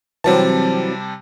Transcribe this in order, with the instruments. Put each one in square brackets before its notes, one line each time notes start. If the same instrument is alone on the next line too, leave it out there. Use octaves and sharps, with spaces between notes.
[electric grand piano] C3 G3 A5 [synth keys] E3 F#3 C4